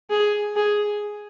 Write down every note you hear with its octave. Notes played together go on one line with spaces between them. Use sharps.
G#4
G#4